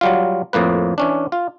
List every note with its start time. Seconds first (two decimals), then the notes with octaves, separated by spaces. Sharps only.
0.01 F#3 G3 F4
0.53 F2 A2 A#3 B4
0.98 E3 C#4 D4
1.32 F4